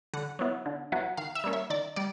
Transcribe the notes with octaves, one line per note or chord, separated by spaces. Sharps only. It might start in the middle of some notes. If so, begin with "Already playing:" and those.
D3 F#5
F#3 B3 E4
D3
F#3 B3 E4
D#3 F5
E5
G3 A#3 C#4
E5
D#3 D5
G3 D5